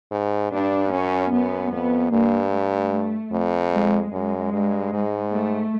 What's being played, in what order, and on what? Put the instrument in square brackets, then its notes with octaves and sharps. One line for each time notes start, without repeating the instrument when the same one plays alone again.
[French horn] G#2
[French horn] G2 [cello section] D4
[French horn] F#2 [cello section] C#4
[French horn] F#2 [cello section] B3
[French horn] F2 [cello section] B3
[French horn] G2 [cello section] A#3
[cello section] A3
A3
[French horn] F2
[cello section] G#3
[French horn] F#2 [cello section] G#3
[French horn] G2
G#2
[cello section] A3